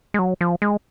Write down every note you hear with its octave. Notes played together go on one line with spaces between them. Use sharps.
G#3
F#3
F3
G#3